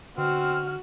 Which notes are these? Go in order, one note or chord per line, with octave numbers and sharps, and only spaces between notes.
B2 D3 C4 F#4 F6